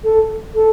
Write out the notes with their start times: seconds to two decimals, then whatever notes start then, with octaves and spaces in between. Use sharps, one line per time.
0.04 A4
0.55 A4